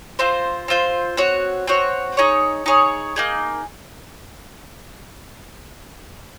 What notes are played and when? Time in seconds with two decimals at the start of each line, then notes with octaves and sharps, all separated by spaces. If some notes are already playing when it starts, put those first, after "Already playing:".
0.19 C4 F4 C5
0.68 C4 F4 C5
1.17 C4 F#4 C#5
1.67 C4 F#4 C#5
2.17 D#4 G#4 C#5
2.66 D#4 G#4 C#5
3.16 A#3 D#4 G#4